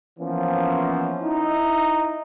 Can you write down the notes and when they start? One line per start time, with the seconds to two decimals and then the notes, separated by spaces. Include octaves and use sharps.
0.20 E3 F3 A#3 B3 C#4
1.22 D#4 E4